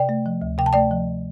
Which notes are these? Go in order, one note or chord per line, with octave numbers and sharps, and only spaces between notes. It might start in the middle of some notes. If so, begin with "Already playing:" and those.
Already playing: C3 D5 G5
A3
F3
D2
C3 G5
A5
A3 D5 G5
F3